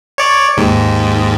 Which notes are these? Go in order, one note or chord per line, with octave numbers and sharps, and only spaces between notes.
C#5 D5
D#2 G#2